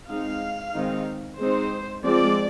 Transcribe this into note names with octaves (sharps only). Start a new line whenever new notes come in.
G#3 C4 D#4 F5
D#3 G#3 C4 D#4
G#3 C4 D#4 C5
F3 G#3 C4 D5